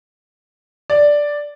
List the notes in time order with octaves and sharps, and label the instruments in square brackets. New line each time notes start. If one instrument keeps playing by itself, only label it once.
[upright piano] D5